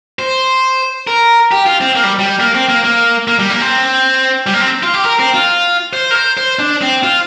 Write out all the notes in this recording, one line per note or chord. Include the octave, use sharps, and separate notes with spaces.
C5
A#4
G4
F4
C4
A#3
G3
G3
A#3
C4
A#3
A#3
A#3
G3
A#3
C4
G3
A#3
C4
F4
G4
A#4
C4
F4
C5
A#4
C5
C5
D4
C4
F4